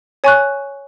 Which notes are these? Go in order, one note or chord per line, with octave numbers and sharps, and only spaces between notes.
C#5 G#5 C#6 F#6